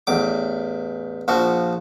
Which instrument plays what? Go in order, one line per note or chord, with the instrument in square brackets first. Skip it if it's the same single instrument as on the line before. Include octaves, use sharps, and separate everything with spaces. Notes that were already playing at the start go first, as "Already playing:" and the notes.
[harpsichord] A1 E2 D6
A#1 F3 F#4